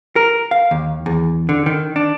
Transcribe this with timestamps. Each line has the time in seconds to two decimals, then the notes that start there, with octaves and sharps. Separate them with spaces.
0.16 A#4
0.51 F5
0.71 D#2
1.06 E2
1.49 D3
1.66 D#3
1.96 D4